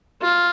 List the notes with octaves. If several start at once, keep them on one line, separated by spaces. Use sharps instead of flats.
F4